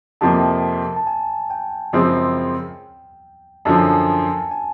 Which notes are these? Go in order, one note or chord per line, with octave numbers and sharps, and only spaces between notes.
F2 C3 F3 A#3 A5
A5
G#5
G5
F#2 C#3 F3 G#3 C4
F#2 D3 F3 A5
G#5
A5
G#5